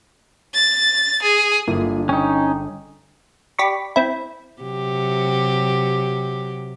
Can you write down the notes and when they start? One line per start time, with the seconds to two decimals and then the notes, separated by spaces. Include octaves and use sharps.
0.54 A6
1.23 G#4
1.68 G1 A#3 E4 F4 G#4
2.09 C#4 D#4 G5
3.59 G4 D5 B5 C#6
3.96 C4 E4
4.62 C3 F#3 G4